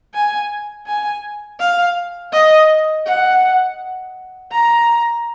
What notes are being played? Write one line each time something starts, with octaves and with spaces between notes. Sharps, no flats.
G#5
G#5
F5
D#5
F#5
A#5